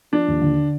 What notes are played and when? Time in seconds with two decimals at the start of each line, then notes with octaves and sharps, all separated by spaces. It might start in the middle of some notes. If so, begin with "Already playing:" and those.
0.12 F3 D4
0.28 D#2
0.42 D3